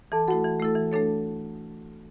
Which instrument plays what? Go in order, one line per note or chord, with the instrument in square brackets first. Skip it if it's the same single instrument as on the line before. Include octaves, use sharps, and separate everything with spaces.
[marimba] E3 [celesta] A4 A5
[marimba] A3 E4 A4 [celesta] F#4 F#5
[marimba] E3
A3 E4 A4
E3
A3 D4 A4 C#5